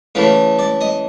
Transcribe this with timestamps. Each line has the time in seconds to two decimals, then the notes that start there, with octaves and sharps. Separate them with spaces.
0.15 C#3 E3 A3 F5
0.59 D5
0.81 D#5